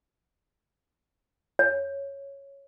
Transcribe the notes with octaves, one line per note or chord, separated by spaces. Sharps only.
C#5